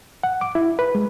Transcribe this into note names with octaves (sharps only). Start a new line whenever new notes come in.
F#5
D6
E4
B4
G#3